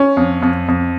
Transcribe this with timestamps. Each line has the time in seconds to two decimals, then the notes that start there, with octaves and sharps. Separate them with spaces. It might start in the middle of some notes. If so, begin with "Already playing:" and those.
Already playing: C#4
0.17 F2
0.42 F2
0.68 F2